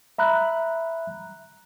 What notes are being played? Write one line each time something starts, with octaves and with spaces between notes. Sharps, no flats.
E5 A#5 B5 F#6